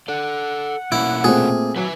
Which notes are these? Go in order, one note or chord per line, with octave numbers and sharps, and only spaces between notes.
A4 D5 F#5
B2 A#3 C#4 E4
A#2 A3 C4 G#4
F#3 B4 E5 G#5